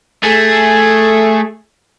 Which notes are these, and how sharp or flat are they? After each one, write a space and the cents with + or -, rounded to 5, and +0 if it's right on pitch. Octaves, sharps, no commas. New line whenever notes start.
A3 +0 G#4 +0